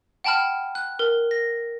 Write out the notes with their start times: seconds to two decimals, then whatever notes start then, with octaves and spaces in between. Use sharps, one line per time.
0.24 F#5 G5 A5 B5 F6
0.75 F#6
0.99 A#4
1.31 A#6